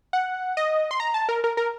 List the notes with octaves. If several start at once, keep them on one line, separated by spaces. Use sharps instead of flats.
F#5
D#5
C6
A#5
A5
A#4
A#4
A#4